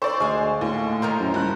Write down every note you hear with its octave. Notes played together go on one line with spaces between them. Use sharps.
C5 D5 C6 C#6 E6
D2 G#3 F5 G#5
D#2 A2
D#3 A#4 C5
F#2
C#2 G2 F#6